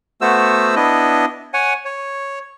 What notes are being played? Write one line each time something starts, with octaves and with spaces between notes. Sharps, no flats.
A3 B3 F#4 C5 E6
B3 D4 E4 D#5
C#5 F#5 G#5
C#5